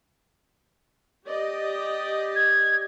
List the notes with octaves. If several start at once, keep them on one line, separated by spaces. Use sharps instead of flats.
G4 D5 D#5
G#6